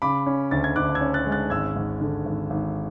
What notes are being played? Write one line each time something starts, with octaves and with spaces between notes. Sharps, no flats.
C#3 B5 D6
C#4
D2 A6
G#6
D2 D6 F#6
E6 G#6
C#4
F#6 A6
G#3
F#6 A6
G#1 E6 G#6
G#1
D3
G#1
G#1